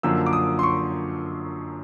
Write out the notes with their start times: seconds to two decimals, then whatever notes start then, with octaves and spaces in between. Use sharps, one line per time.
0.03 F#2 D3 F3 A#3 E6
0.26 D6
0.33 D#6
0.59 C6
0.63 C#6